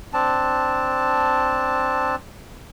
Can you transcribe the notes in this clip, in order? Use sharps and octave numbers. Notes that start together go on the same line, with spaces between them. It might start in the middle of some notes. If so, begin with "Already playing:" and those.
C4 D4 A5